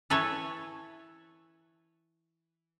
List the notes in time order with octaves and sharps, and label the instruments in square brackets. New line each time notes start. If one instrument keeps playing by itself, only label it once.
[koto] E3 A4 B4 C#5